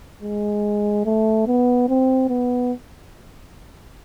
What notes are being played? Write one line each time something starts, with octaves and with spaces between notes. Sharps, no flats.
G#3
A3
B3
C4
B3